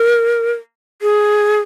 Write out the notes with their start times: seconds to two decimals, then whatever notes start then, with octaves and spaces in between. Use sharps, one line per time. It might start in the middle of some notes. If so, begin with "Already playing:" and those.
Already playing: A#4
1.02 G#4